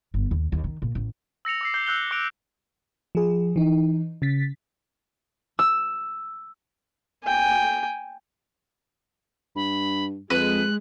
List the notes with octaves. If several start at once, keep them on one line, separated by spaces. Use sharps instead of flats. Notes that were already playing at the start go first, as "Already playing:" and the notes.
G1
D#2
D#2
D#3
A#2
A1
E6 A#6 C#7 F7
D6 E6 C7
D6 G6 C7 G7
E6 F#6 G6 G7
D6 F#6 D7 F7
F3 G#4
E3 D#4
C#3 A6 B6
E6
G5 G#5
G2 B5
F2 G#3 B4 F#6